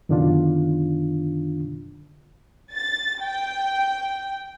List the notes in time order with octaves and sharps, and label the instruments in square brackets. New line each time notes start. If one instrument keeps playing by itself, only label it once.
[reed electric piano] F#2 B2 D3 D#3 D4 F4
[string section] A6
G5